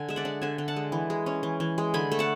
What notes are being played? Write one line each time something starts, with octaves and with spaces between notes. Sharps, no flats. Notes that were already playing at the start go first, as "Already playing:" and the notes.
Already playing: D3 G#5
G#3 E5
D5 F#5
D4
D3 E5 G#5
D3
F#5 A5
G#3
E3
G#3
C#4
E3
E3
G#3
D3 G#5 B5
A3
F#5 A5